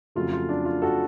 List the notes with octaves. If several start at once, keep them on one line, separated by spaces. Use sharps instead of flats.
F2 C#3 F#3 A3 F4
F4
D4
F4
F#4 A4